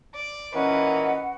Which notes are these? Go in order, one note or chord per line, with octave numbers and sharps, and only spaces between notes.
D5
A#2 E3 C#4 A#4 B4 D#5 F#5